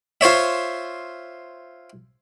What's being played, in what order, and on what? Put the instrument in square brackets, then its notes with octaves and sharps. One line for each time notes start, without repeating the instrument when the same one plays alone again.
[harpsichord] F4 C5 C#5 E5